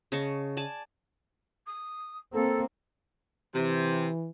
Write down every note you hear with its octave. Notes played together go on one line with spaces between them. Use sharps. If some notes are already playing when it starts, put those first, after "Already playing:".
C#3 D#5 A5 C#6
D5 G#5 A5
D#6
A#3 C4 A4
C3 E3